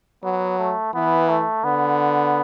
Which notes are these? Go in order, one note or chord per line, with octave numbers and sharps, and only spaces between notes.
F#3 B3
A3
E3 B3
A3
D3 B3